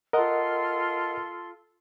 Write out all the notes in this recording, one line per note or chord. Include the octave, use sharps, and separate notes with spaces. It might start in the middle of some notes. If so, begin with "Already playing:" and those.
F4 A4 A#4 D#5 F#5 C6